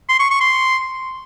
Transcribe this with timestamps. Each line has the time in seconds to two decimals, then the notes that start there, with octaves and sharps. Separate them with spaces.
0.09 C6
0.20 C#6
0.30 C#6
0.41 C6